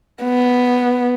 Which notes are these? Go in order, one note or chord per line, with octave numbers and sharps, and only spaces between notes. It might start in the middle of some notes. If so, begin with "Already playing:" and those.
B3